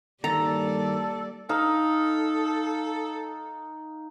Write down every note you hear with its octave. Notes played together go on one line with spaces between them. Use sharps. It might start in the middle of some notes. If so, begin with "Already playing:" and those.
G2 D#3 G3 A#3 A4 D5 A#5
D#4 A4 F5